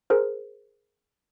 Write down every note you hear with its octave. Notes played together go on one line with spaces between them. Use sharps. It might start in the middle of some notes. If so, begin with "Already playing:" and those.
G#4 A#4 C5